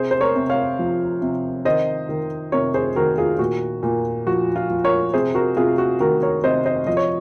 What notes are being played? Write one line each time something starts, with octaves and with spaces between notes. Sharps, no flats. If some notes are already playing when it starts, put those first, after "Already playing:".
Already playing: C3 G#4 C5
C5
A#4 C#5
C3
C#5 F5
F3
C3
D#3 C5 D#5
D#3
C3 A#4 C#5
G#4 C5
D#3 F#4 A#4
F4 G#4
A#2 F#4
A#2
F3 F#4
F4
F3
A#4 C#5
C3 G#4 C5
F#4 A#4
C3 F4 G#4
F#4
D#3 F#4 A#4
A#4 C#5
C3 C5 D#5
C5 D#5
F3 D#5
C#5